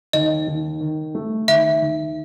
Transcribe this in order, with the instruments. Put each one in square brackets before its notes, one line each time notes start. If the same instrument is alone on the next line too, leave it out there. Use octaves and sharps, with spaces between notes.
[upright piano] D#2 [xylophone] D#5
[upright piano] D#2
D#3
A3
[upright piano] D#2 [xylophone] E5
[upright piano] D#2